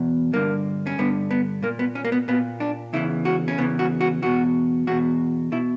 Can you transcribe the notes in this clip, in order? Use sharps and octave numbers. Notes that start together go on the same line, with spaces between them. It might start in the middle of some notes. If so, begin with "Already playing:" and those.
Already playing: E2 B2
G2 D3 A#3
C#4
G2 D3 B3
B3
A#2 A#3
B3
C#4
A#3
B3
A#2 B3
D4
E2 C#3 E3 E4
F#4
C#4
E2 C#3 E3 B3
F#4
F#4
E2 B2 F#4
E2 B2 F#4
B2 E4